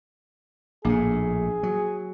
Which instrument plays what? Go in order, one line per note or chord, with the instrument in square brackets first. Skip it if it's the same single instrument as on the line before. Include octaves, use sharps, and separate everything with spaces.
[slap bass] A#1 A2 [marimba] A#3 D4 [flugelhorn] G#4
[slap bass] F#3